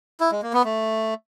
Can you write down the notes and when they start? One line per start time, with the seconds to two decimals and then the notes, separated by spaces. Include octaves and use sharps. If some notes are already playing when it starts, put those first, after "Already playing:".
0.20 E4
0.31 G#3
0.42 A#3
0.53 B3
0.64 A3